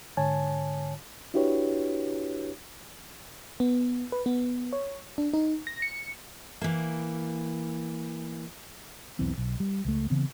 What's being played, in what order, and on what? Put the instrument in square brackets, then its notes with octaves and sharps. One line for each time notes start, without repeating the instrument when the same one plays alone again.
[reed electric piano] G#2 D3 C#5 G#5 A5
D4 E4 F#4 G4 B4 C#5
[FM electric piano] B3
B4
B3
C#5
D4
D#4
A#6
C#7
[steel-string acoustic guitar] E3 A#3
[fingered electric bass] E1 B1 E3 C4
B1
G3
C#2 A3
C#3 E3 B3 C4